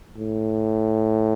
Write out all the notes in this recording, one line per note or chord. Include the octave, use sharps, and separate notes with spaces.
A2